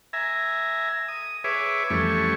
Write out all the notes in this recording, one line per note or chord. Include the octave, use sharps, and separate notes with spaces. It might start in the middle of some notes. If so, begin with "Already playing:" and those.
E5 G#5 A#5
D#6
G#4 B4 C#5 E5 D6
F2 E3 G3 A3 C#4 C#6